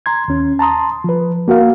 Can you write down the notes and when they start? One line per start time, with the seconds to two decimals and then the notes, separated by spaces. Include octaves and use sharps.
0.06 A#5 C6 G#6
0.28 D#2 C#4
0.59 A5 A#5 C6 D#6
1.04 F3 B4
1.48 A#3 F#4 A#4 F5